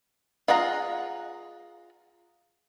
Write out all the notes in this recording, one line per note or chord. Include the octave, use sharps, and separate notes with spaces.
F4 G#4 F#5 A#5